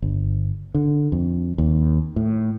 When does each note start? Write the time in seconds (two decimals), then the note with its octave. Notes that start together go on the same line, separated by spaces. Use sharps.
0.02 G1
0.75 D3
1.12 F2
1.58 D#2
2.16 A2